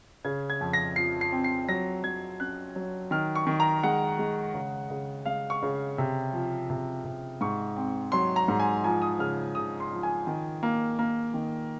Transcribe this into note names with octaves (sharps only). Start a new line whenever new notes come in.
C#3 G#6
G#6
F2
A#6
F3 C7
C7
C4
C7
F#3 A#6
F#3 G#6
C#4 F#6
F#3
D#3 F6
C#6
D#3
A#5
G#3 F#5
G#3
C#3
C#3
G#3 F5
C#6
C#3
C3
F3
C3
C3
G#2 C#6
C4
F#3 C6
A#5
G#2
G#5
F3 G#5
D#6
C#3 F6
C#3 D#6
C6
F3
G#5
D#3
A#3
A#3
D#3